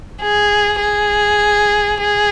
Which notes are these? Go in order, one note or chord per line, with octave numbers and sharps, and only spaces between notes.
G#4
G#4
G#4